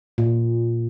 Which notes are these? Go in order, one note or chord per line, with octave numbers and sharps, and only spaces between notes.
A#2